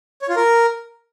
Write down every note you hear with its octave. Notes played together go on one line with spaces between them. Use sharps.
C#5
F4
A#4